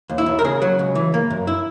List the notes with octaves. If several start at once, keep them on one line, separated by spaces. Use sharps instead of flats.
D#2
E4
D#2
A#4
C#3 G#4
F#3
C#2
E3
A#3
F#2
E4